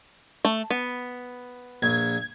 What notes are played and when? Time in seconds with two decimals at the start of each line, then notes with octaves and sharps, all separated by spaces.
0.45 A3
0.70 B3
1.82 A#1 G#6